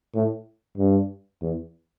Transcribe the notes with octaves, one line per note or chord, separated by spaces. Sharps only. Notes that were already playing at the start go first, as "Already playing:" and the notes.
A2
G2
E2